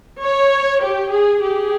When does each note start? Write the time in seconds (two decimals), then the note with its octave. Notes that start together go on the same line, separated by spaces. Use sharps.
0.21 C#5
0.81 G4
1.11 G#4
1.42 G4 G#4